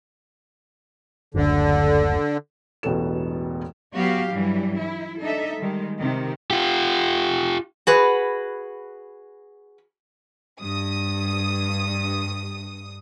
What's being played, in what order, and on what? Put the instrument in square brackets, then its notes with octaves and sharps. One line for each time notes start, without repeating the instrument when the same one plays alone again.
[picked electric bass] F#1 D2 [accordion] D3
[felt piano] E1 A1 B2 B3 A4 E7
[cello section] F#3 B3 F#4 G4 F5
G2 E3 F#3 G3
E4
D4 D#4 A4 D#5 E5
D#3 G3 G#3
C3 D#3
[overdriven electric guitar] F4 G4
[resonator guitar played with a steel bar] F#4 G#4 B4
[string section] G2 D#6